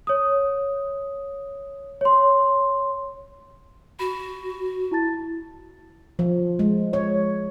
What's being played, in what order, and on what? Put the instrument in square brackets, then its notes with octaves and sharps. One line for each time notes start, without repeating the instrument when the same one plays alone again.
[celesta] C#5 D#6
C#5 C6
[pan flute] F#4 [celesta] B5
[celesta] E4 A5 A6
[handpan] F3
G#3
C#5